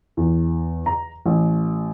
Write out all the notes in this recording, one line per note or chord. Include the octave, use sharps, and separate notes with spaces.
E2
A#5
A1